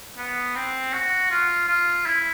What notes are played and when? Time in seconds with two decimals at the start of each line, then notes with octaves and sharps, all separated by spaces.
0.18 B3
0.56 C4
0.94 F#4
1.31 F4
1.69 F4
2.06 E4